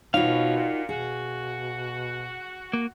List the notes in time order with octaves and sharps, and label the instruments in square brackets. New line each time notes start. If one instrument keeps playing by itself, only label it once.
[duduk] B2 [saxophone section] E3 F3 C#4 [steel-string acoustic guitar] D#4 F4 F#4 [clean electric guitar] F5
[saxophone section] A#2
[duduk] B2 [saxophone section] F#4 [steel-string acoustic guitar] G#4
[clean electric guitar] A#3